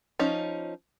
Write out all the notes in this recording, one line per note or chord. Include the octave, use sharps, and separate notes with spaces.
F3 C#4 D#4